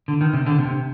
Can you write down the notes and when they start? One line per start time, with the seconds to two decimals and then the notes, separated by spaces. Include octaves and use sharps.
0.08 D3
0.21 D#3
0.33 C3
0.46 D3
0.58 C3